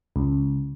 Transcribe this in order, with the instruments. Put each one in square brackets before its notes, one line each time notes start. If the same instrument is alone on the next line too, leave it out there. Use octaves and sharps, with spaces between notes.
[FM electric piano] C#2